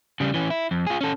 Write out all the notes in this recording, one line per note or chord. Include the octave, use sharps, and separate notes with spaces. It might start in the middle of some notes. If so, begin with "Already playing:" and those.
C#3 G3
E3 C#4
E4
F2
F4 G#4
C#4 A4